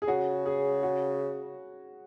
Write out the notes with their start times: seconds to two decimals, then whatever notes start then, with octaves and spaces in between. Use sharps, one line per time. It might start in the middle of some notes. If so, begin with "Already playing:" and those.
0.02 G#4
0.08 C#3 F#4
0.46 G#4
0.83 F#4